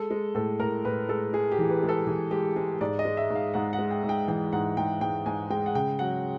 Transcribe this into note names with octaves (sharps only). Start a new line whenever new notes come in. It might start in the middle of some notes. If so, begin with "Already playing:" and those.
Already playing: G#3 A4
G#3
A2 A4
A2 A#4
A2 B4
G#3 A4
G#3 G#4
G4
E3
B4
G#3
A4
E3 G#4
G#3 G4
G#3 G#4
G#2 D5
D#5
G#3
E5
G#2
F5
G#2 F#5
F#5
G#3
G5
G#2
G5
E3 G5
G#2 F#5
G#2 G5
G#2 G5
G#2 G#5
G#3 G5
F#5
C#3 G5
F#3 F#5